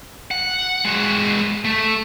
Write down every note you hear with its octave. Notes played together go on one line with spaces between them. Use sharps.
F#5
G#3 F#4
A3